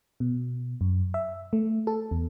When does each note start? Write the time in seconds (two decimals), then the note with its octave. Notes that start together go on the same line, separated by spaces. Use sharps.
0.20 B2
0.81 F#2
1.14 E5
1.53 A3
1.87 A4
2.11 E2